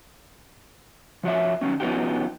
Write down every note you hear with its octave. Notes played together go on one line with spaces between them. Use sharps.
F3 F#4 C#5 E5
D#3 F#3 G#3 C#4
F3 B3 C#4 D#4 F#4 G4